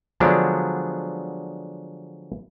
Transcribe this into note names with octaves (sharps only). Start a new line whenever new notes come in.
D3 F3 F#3 G#3 B3 D4